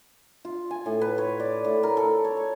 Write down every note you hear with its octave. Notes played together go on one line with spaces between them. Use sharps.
F4
G#5
A2
B4
C#5
D5
A2
A#4
A4
C#5
C#5